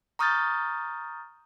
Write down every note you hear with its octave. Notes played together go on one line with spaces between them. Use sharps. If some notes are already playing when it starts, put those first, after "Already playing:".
A#5 C#6 D#6 F6 G6 A6